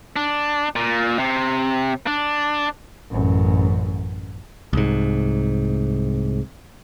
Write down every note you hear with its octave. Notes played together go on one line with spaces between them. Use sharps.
D4
A#2
C3
D4
A1 F#2
C2 G#2